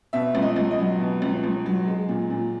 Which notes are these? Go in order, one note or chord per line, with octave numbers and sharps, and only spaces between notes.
B2 E5
C#2
D#5
C#2
D#5
F#3
B2
C#2
C#2
F#3
G#3
A#2
A#2